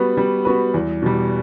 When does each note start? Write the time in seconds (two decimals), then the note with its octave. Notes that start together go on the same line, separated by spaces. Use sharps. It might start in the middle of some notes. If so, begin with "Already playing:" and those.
Already playing: G3 B3 F#4 B4
0.17 G3
0.45 B3 F#4 B4
0.74 E2
1.02 B2 G3